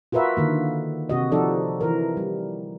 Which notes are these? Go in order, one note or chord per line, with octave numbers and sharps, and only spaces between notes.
F4 F#4 A#4 B4 E5
D3 D#3 A#3
C3 F#4 D#5
F3 D#4 F#4 A4 D5
E3 A#4
G3